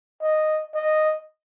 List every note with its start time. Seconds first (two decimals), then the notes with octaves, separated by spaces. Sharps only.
0.21 D#5
0.74 D#5